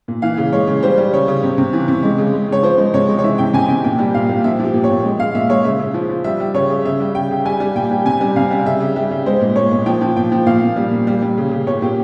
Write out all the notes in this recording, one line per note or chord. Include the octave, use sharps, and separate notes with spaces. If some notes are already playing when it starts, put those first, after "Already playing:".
A#2
E3 F5
C#3
G#3 C#5
C#3
G3 C5
G3
C#3 C#5
C#3
C3
C3
E3
C3
G#3
C#3
G#3
C#3 C#5
F3 C5
G#3
C3 C#5
G#3
C#5
E3 E5
C3 G5
C3 G#5
C3 G5
A#2 G5
G3
A#2 F5
A#2
F3 E5
F3 G4
A#2
C#5
A#2
G#3
G#3 F5
A#2 E5
G#3 C#5
C#3 E5
C#3
F3
F3
G3 E5
G3
C#3 C#5
C#3
C#3 E5
G3
C#3 G5
C#3
G3 G#5
G3
A#2 G5
G3
C3 G#5
G3
C3 F5
G3
C#3 E5
C#3
G3 E5
C#3
G#3 C5
A#2
A#2 C#5
A#2
F3 G5
F3
A#2 G5
F3
A#2 F5
A#2
G3
A#2
G3
G3
C#3
C#3
A#2 C#5
A#2 G4